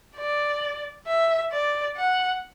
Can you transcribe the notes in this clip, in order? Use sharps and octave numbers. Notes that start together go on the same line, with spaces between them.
D5
E5
D5
F#5